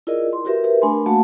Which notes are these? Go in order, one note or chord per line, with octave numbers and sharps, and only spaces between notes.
E4 F4 G#4 A#4 D5 D#5
C6
E4 F#4 G4 A#4 B4 E5
G4 A#4 B4 E5
A3 D4 G#5 B5 C6
A3 A#3 F#4 F5 F#5 A5